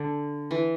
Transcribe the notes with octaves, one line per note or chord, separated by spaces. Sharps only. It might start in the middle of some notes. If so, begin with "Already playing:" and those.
Already playing: D3
E3